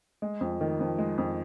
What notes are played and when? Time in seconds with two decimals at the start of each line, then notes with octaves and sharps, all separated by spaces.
0.22 G#3
0.41 F2
0.61 D#3
0.80 F2
0.98 G#3
1.18 F2